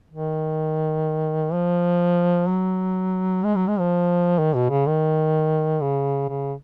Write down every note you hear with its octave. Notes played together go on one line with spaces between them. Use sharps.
D#3
F3
F#3
G#3
F#3
G#3
F3
D#3
B2
C#3
D#3
C#3
C#3